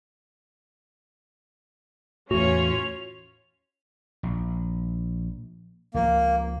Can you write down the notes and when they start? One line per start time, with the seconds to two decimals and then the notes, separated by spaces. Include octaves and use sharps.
2.31 E2 A2 C#4 F4 F#4 C#5 F7
4.23 A#1
5.94 C#2 F3 A#3